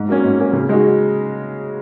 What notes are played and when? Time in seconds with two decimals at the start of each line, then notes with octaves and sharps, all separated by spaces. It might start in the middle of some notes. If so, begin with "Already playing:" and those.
Already playing: G#2
0.08 F#3 A#3 C#4
0.24 G#2
0.39 F#3 A#3 C#4
0.53 C#3
0.69 G#3 D#4 F#4